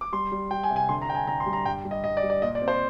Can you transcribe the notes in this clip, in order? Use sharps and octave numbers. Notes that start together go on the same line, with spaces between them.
D6
G3 C6
G3
G3 G5
G#5
C3
G#5
D3 C6
A#5
D4 G5
G#5
D3 A#5
C6
G3
A#5
G2 G5
G3
D#5
G2 D#5
D5
G3
D5
A#2 D#5
D5
C4
C5